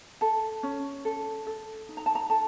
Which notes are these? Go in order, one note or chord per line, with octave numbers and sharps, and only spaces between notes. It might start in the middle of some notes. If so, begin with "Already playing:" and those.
A4 A5
C#4
A4
A4
D#4
A#5
A5
A#5
A4 A5